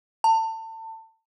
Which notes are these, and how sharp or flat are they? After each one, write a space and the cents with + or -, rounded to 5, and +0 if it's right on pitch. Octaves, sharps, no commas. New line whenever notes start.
A5 +30